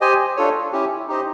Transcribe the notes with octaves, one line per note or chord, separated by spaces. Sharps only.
G4 C5 D#5 G#5
D4 F4 A4 C#5
C#4 E4 G4
D#4 G4 C5 D#5